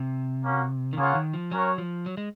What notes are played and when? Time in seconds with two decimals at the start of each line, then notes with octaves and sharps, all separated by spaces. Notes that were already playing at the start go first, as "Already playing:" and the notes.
Already playing: C3
0.43 A#3 C#4 F#4
0.93 D#3
0.98 C#3 A#3 F4 G#4 C#5 F#5
1.15 D#3
1.34 F3
1.51 F#3 C#4 F#4 A#4 C#5
1.78 F3
2.06 F#3
2.17 G#3